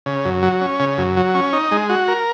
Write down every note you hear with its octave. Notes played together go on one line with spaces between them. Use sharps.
C#3
F#2
F#3
C#4
C#3
F#2
F#3
C#4
D#4
G#3
F#4
A#4